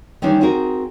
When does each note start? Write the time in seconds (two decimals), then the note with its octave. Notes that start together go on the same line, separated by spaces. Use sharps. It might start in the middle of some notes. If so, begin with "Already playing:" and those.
0.22 D#3 E3 G3 C#4 D4
0.41 C4 D#4 F#4 G#4 A#4